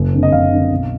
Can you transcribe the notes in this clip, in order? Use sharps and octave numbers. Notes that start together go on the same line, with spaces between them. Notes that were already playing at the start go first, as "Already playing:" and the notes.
Already playing: F#1
F2 D3
D#5
F#1 F5
F2 D3
B1